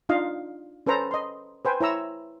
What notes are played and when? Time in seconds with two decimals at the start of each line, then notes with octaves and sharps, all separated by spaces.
0.09 D4 D#4 F4 D#5 F5
0.86 C#4 A4 B4 C5 A#5
1.11 D#5 C6
1.65 B4 C5 G5 G#5
1.80 E4 C#5 A#5 E6